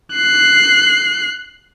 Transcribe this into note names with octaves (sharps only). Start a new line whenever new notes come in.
F#6 C7